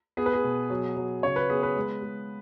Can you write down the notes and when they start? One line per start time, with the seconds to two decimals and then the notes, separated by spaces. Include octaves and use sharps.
0.17 B3 G#4
0.26 B4
0.33 G#4
0.44 B2
0.70 F#3
0.97 F#3
1.23 C#3 C#5
1.36 B4
1.50 B3 G#4
1.63 B4
1.76 G#3
2.02 G#3